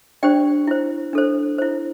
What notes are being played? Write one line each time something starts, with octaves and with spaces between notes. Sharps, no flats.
D4 G4 C5 D5 G5
E4 C5
D4 A4 C5
E4 C5